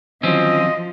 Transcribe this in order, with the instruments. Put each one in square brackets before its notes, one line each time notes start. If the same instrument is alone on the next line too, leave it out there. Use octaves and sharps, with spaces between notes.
[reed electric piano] D3 D#3 F#3 [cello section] F3 [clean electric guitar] C4 C#4 [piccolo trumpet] D#5